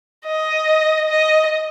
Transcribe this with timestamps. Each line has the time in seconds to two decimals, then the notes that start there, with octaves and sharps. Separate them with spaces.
0.25 D#5
1.08 D#5